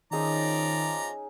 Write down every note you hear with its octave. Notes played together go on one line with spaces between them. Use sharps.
D#3 F3 C#4 D#4 G#4 D5 A#5